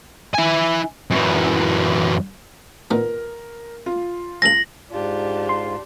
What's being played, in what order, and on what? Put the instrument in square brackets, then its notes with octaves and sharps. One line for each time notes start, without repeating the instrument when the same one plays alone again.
[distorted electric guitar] E4 G#5
F#2 E3
[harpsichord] A#2 D#3 B3 [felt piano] A#4
[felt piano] F4
[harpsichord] C#2 A4 G#5 [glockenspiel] A#6 F#7
[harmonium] G#2 F4 [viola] D4 G4
[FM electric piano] C6